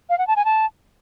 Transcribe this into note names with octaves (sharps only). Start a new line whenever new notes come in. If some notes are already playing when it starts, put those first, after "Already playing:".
F5
F#5
A5
G#5
A5